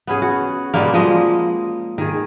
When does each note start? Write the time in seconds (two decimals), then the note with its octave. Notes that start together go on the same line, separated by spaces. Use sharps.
0.07 B3 C#4 G#4
0.22 F#4
0.74 B2 G3 G#3 A#3
0.94 F3 G#3 D#5
1.98 D#3 G#4